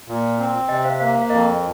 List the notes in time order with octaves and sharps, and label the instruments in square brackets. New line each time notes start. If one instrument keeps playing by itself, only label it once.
[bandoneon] A#2
C4
[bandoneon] C3 [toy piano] D#5 G5
[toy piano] C5 F5
[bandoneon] A#3 [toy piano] C5 F5
[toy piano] C5 F5
[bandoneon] F2 [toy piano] A#4 D#5